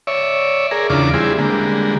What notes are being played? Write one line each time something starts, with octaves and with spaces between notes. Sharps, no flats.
C#5 D5 E5
G#4 A#4 D5
E2 C#3 D4 F4 D5 D6
G3 C4 E4 G#4
D3 G3 G#3 A#3